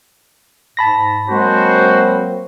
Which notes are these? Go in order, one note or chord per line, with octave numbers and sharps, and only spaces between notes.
G#2 A5 B5 A#6
F#3 G#3 A#3 C4 F#4 C5